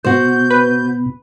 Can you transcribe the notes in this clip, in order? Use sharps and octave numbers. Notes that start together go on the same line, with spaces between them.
B2 F#4 C5 G6
B4